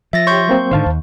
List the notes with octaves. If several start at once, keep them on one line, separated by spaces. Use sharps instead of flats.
F3 E5 A6 A#6
G4 C#5 C6 C#6 G6
F#3 A#3 C4
G#2 D3 D#3 C5 F5 A5
D#2